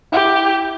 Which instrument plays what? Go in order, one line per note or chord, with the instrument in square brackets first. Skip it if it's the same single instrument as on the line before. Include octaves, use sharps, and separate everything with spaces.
[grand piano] E4 [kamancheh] G4